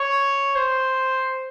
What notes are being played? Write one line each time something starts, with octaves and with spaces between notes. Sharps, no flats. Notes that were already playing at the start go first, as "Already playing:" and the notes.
Already playing: C#5
C5